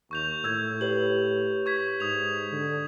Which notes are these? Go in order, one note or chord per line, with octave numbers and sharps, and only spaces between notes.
D#2 C#6 G6 F7
A2 E6 G#6
G4 B4 C#5 F#7
C#6 G#6 B6
G#2 D#6 F7
D3